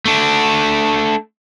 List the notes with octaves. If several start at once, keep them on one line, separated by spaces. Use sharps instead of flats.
A3 D4